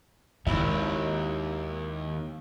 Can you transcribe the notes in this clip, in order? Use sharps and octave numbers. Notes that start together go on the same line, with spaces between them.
G#1 D#2 D#3 E4 E5